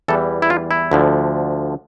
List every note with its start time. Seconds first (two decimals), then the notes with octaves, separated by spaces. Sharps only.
0.08 E2 E3 G3 A4
0.42 E4
0.50 F4
0.71 E4
0.91 D2 D3 F3